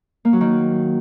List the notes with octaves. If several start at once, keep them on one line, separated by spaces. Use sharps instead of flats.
A#3
F#3
D#3